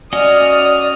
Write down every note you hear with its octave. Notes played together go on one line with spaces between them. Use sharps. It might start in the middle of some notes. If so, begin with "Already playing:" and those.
C#4 F#4 D5 D#5 D#6 F6